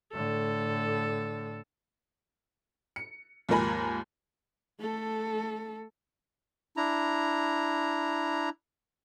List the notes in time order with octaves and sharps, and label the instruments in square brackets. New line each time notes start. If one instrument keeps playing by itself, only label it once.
[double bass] A2 D3 [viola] A4
[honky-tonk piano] C#7
D#2 G#2 F3 A#4 G#5 B5
[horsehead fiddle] A3 A4
[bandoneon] D4 E4 A#5